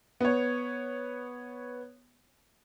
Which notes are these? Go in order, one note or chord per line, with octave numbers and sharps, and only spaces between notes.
B3 C#5